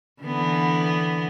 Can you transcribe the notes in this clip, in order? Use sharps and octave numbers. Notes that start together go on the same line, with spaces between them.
D3 E3 B3